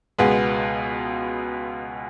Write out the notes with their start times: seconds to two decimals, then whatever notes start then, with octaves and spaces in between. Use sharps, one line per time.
0.18 C#2 B2 G#3 B3